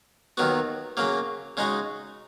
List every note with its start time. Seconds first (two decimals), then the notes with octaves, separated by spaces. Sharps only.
0.37 D#2 D#3 F#3 B3 F#4
0.97 C#3 F#3 A#3
1.57 C#3 G#3 D#4 F#4